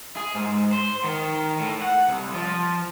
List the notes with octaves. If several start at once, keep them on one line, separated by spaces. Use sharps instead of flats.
G#4
G#2
C5
D#3
A2
F#5
C2
F3